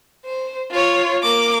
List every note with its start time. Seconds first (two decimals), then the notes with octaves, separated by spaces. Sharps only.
0.25 C5
0.71 F4 C#5
1.22 A#3 D6